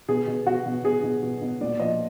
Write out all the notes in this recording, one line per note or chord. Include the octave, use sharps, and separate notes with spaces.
B2 G#4
B2
B2 F#4
B2
B2 G#4
B2
B2
B2
A#2 D5
F3 D#5